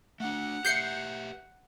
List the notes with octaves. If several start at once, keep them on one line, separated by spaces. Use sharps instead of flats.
A3 D4 F#5
G4 B4 E5 G6 C7 C#7